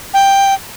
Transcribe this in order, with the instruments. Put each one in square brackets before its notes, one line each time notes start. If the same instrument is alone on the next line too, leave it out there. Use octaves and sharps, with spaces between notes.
[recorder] G5